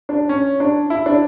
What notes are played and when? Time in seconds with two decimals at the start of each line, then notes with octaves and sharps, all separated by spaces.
0.09 D4
0.29 C#4
0.60 D4
0.90 E4
1.06 D4